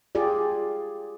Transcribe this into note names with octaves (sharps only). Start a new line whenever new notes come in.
F4 G4 G#4 D5